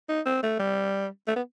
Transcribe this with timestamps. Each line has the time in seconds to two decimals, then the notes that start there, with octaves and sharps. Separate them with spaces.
0.09 D#4
0.26 C4
0.43 A3
0.59 G3
1.27 A3
1.36 B3